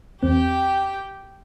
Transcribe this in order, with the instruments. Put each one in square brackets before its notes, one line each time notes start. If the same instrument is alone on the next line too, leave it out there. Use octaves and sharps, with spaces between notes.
[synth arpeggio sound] E2 C4 [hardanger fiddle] G4 G5